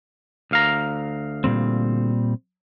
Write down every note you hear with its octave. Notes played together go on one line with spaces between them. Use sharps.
D2 F5 A#5
A#2 G3 C4